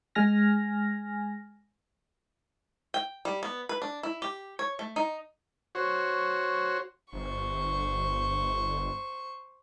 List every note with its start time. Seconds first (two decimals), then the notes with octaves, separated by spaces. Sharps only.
0.15 G#3 G#5 F6 A#6
2.94 G5
3.25 G3
3.43 B3
3.69 B4
3.82 D4
4.03 E4
4.22 G4
4.59 C#5
4.79 A3
4.96 D#4
5.75 F#4 C5 C#5
7.13 G1 C5 C#6